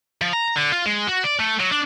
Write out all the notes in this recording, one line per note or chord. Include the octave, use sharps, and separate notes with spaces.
F3
A#5
D3
F4
G#3
F#4
D5
A3
F#3
D4